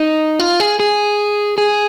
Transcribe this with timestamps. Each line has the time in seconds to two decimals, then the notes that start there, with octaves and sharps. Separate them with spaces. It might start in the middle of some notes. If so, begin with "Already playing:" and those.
Already playing: D#4
0.39 F4
0.60 G#4
0.80 G#4
1.58 G#4